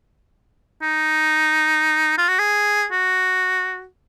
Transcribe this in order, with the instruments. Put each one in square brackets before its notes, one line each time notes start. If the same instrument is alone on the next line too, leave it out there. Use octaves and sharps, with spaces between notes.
[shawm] D#4
F4
F#4
G#4
F#4